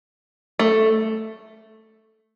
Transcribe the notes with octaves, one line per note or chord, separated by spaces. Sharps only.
A3